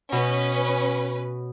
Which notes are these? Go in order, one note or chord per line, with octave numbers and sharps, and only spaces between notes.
B2 C#4 B4